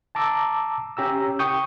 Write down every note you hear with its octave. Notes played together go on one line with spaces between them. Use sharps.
A5 A#5 D6 E6
C#4 G4 A#5 E6
G5 C#6 D#6 G6